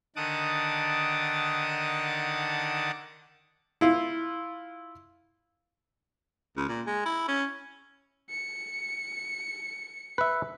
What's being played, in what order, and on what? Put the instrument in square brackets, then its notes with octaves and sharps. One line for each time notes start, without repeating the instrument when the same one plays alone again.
[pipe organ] D3 D#3 F#5 A5 D6 D#6
[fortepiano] E4 F4
[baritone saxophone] C#2
A#2
G#3
E4
C#4
[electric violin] C#7
[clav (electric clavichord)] B4 E5